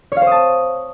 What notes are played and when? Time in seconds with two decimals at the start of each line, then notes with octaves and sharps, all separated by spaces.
0.12 C#5
0.17 F5
0.22 C5
0.27 D#6
0.32 A5